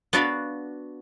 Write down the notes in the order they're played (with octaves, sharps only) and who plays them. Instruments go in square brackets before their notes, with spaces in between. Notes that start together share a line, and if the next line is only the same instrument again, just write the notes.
[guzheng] B3 D4 F#4 D5 F5 B5